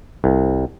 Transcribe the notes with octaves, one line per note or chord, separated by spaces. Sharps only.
C2